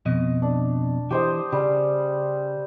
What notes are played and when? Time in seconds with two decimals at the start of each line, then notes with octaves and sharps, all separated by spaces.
0.06 F2 B2 D#5
0.42 D4
1.11 E3 G4 C5 D#5
1.52 C#3 G3